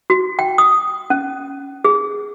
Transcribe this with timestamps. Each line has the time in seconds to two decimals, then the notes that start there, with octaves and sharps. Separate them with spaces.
0.10 F#4
0.39 G5
0.58 D#6
1.10 C#4
1.85 G#4